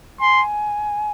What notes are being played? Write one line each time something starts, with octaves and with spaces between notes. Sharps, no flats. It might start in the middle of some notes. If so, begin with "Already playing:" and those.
G#5 C6